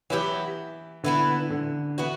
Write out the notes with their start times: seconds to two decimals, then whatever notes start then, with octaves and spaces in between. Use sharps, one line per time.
0.10 E3 F#3 B3 E4 G4
1.04 D3 E3 B3 E4
1.50 D3
1.98 E3 B3 F#4